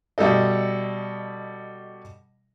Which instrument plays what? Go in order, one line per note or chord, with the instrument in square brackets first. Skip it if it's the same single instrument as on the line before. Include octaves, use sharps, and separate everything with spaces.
[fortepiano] B2 G3 E4 A4 D#5